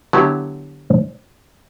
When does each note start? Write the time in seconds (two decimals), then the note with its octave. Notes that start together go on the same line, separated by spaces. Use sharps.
0.13 D3 F#3 B3 E4 G4